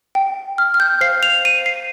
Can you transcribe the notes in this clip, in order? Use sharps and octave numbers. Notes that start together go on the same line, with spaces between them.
G5
F6
F6
G6
C5 F5 C7
F7
D#7
C7